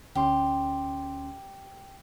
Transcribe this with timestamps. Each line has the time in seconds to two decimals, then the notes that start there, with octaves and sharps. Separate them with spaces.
0.15 D2 C#4 G4 C6